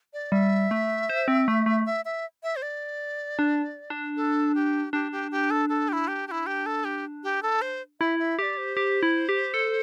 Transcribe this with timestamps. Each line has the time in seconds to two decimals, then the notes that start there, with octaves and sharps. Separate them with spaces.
0.13 D5
0.32 G3 E5
0.71 A3
1.09 C5
1.28 C4
1.48 A3
1.66 A3
1.86 E5
2.05 E5
2.43 E5
2.56 C5
2.62 D5
3.39 D4
3.90 D4
4.16 A4
4.55 G4
4.93 D4 G4
5.12 G4
5.31 G4
5.51 A4
5.69 A4
5.89 G4
5.93 E4
6.08 G4
6.28 G4
6.31 E4
6.46 G4
6.66 A4
6.85 G4
7.23 G4
7.43 A4
7.62 C5
8.00 E4 E5
8.19 E5
8.38 G4 D5 E5
8.58 C5
8.77 G4
9.03 E4
9.29 G4
9.54 A4